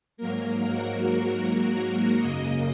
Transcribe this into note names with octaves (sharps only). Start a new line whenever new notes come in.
G#2 F#3 A#3 A#4
F#4
F#4
F#2 C#3 A#3 D#5